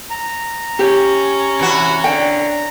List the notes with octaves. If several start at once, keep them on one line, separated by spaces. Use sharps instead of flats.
A#5
C#4 G4
C3 E3 F#4
D3 G5